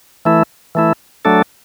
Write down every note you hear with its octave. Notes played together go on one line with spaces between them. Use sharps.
E3 A3 E4
E3 A3 E4
F#3 A3 D4 A4